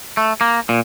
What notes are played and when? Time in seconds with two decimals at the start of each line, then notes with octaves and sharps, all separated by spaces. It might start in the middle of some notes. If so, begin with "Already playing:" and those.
0.17 A3
0.41 A#3
0.69 A#2